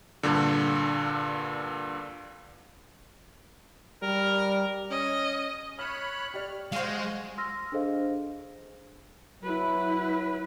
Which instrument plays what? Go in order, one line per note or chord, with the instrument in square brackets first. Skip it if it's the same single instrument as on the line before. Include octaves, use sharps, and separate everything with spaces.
[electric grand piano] G2 A#2 D3
[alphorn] G3 [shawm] A#4
[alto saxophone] C#4 [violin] D#5
[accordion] C#5 B5 F#6 [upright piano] F6 E7
[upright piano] G4 D5 [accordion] F6
[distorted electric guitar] G#3 [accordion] F#4 [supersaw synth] C5 F5
[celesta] C6 E6 F6 A#6
D4 G#4 A4 C5 D#5 F5
[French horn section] F#3 [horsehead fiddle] E4 B4